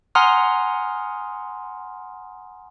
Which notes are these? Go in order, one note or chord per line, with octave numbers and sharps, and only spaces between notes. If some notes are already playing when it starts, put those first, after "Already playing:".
F#5 G#5 A#5 C6 D#6 F6